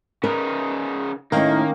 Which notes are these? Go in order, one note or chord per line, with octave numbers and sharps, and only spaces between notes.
C#3 D#4 A#4 B4
A2 D#3 A#3 C#4 D#4 A#4 F5 G5